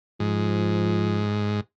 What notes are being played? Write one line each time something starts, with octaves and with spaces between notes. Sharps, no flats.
G#2 F3